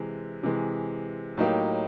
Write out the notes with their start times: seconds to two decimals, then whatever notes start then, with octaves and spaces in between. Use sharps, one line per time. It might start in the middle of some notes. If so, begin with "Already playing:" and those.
Already playing: C3 E3 G#3
0.43 C3 E3 G#3
1.37 A2 F#3 A#3 D#4 G4